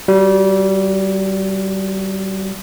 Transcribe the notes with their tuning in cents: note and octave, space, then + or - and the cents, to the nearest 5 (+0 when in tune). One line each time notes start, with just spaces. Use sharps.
G3 -25 F#4 +0